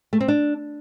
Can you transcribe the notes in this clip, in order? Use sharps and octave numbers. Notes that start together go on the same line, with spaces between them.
A3
C4
D4